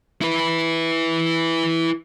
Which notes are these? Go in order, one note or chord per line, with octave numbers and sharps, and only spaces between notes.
E4 B4